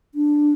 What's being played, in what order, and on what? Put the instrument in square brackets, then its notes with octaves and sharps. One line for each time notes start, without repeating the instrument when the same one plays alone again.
[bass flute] D4